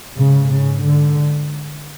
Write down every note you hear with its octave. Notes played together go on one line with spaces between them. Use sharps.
G#2 C#3
C#3
D3